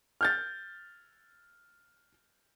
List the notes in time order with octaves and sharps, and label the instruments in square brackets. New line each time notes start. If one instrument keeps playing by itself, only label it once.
[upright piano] F6 G6 A6